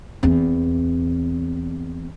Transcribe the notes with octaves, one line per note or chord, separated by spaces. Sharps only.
E2 C4